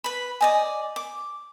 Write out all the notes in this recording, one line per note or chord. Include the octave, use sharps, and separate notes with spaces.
B4 B5
D5 D#5 G#5
D6